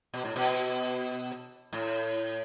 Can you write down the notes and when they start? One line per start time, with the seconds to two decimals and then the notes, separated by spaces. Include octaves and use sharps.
0.14 B2
0.25 A2
0.36 B2
1.73 A2